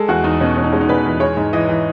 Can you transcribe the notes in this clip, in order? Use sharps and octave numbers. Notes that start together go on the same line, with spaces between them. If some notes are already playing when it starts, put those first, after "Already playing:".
Already playing: G#3 A4
E2 F#4
E2 D#4
B2 C#4
E2 C#4
D#4
G#3 C#4
D#4
B2 B4
E2
G#3 C#5
G#2
E3 D#5
E3